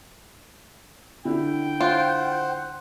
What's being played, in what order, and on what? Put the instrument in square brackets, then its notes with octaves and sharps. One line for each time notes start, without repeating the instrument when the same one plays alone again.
[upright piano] D3 E4 [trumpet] G5
[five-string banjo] F4 [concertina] C5 F#5